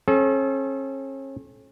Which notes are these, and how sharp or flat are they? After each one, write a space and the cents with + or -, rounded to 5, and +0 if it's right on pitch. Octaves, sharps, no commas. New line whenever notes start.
C#4 -40 A4 -40